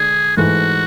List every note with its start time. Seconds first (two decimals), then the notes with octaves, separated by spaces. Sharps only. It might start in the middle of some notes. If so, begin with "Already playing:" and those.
Already playing: D3 G#3 D4 G#4
0.37 G#2 E3 A3 F#4